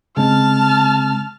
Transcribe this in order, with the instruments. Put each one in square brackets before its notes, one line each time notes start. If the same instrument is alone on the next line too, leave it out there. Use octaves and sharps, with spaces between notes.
[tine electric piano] C#3 G#3 C4 [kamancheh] A5 F6